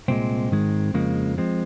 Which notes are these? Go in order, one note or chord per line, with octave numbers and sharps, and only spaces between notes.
C2 A#2 G#3 C4
G#2 D#3 G#3
F2 C#3 F3 G#3 A#3
F3 G#3 C4